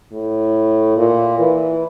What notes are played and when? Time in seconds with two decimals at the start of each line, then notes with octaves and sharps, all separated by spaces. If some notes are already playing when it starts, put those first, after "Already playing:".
0.12 A2
0.97 A#2
1.39 E3